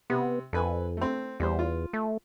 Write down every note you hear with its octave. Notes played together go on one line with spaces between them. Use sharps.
C3 B3
F2 A4 B4 G#5
A3 C4
E2 G3 C5
F4
A3